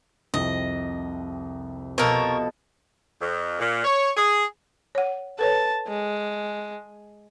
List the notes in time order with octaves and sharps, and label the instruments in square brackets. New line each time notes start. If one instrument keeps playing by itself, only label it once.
[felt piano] C2 F2 C3 [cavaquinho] D#5
[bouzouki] B2 F3 A4 [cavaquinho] A#4 C#5
[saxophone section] F2
A#2
C#5
G#4
[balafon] C#5 F#5
[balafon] A4 B4 C#5 [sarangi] A5
[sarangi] G#3